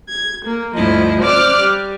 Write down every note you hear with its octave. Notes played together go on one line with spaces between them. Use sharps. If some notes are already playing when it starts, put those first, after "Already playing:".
G#6
A#3
D2 G2 F3 E4 D#5
C5 D5 D6 F6 F#6
G3